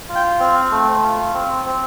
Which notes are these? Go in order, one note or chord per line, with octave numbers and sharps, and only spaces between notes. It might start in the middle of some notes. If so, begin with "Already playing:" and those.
F4
G5
C4
A3
F4
C4
C4